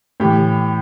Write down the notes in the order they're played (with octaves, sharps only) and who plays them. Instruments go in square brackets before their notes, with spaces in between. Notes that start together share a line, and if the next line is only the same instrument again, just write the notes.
[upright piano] A2 E3 G4